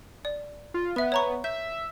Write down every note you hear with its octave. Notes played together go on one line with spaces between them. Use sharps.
D5
F4
B3 B4 E5
C#5 A#5 C#6
E5 G6